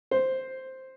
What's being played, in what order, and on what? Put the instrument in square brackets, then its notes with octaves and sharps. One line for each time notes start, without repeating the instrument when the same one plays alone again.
[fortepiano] C5